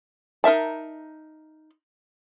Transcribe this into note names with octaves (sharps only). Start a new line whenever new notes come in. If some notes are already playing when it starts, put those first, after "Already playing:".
D#4 A#4 E5 A5